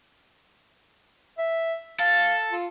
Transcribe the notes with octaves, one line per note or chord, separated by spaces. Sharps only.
E5
A4 F5
F4